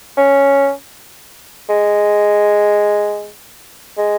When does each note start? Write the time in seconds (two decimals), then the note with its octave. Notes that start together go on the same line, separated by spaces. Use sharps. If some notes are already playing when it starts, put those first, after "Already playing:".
0.17 C#4
1.69 G#3
3.98 G#3